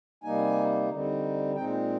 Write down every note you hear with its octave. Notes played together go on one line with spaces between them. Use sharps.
C3 G3 A#3 D#4 G#5
D3 G3 C4 D#4
A#2 G#3 C4 D#4 G5